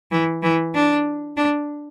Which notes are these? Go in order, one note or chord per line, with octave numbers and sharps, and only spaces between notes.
E3
E3
D4
D4